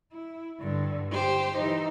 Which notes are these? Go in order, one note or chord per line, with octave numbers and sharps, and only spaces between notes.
E4
G2 D3
G4 C5
E3 D#4